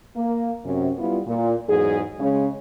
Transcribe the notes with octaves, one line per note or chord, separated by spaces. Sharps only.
A#3
F#2 C3 C#4
G3 B3 E4 F4
A#2
E2 G#2 F#3 G#4
C#3 G#3 C#4